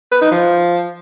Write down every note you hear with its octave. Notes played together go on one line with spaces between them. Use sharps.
B4
D#4
F3